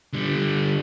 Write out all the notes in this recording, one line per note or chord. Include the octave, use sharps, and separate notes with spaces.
D3 G3